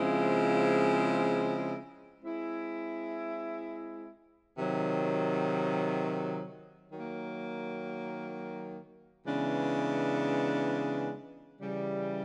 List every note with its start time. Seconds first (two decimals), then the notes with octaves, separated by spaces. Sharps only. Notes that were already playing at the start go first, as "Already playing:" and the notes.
Already playing: C#3 F3 G#3 C4 E4
2.23 G#3 C4 E4
4.58 C3 D#3 F#3
6.92 D#3 F#3 A#3
9.26 C#3 E3 G#3 B3 D4
11.62 C#3 E3 G3